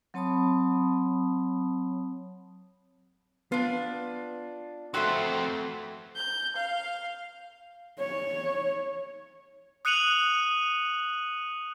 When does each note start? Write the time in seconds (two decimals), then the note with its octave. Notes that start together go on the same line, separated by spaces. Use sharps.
0.14 F#3 C4 C#5 A5 B5 D#6
3.52 B3 D4 F4
4.94 F2 A3 C4 F#4 B4 B5 C6
6.17 G6
6.56 F5
7.99 C#5
9.85 D#6 F#6 C#7 D#7 F7 F#7